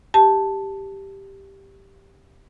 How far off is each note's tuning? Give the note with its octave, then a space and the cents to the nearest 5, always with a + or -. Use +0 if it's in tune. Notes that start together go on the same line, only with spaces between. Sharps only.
G4 +0 A5 +0